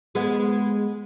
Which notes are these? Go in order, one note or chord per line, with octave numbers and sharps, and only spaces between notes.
G#3 B3